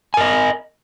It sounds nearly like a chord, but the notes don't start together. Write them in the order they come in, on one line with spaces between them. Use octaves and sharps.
G#5 A#4 D#5